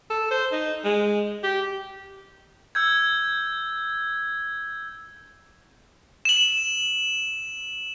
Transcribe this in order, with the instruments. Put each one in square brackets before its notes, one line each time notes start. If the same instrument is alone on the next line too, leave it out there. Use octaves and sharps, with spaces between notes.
[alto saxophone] A4
C5
D#4
G#3
G4
[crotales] E6 G6 G#6
E7 F#7